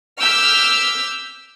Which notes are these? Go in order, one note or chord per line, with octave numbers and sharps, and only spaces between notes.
D6 E6 F6 G6 B6